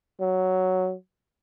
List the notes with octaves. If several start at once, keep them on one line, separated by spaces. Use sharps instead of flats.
F#3